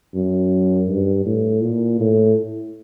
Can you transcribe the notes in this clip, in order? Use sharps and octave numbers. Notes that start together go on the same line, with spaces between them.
F#2
G2
A2
A#2
A2